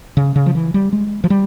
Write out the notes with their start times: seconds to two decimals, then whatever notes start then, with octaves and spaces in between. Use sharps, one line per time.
0.17 C#3
0.36 C#3
0.46 F3
0.55 E3
0.74 G3
0.93 G#3
1.24 F3
1.30 G3